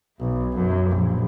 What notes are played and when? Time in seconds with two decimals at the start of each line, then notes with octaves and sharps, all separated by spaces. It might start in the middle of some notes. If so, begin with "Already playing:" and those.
0.19 B1
0.56 F#2
0.89 A#1